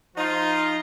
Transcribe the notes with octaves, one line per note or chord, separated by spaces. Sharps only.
F3 D#4 F4